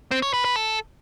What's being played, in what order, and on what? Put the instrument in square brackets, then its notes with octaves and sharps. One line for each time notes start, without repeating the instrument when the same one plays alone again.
[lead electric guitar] C4
C#5
B4
B4
A4